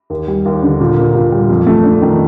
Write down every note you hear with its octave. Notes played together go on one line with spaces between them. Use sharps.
D#2
G3
D#2
D3
A#2
A#3
A#2
G3
F2
A3
D4
D#3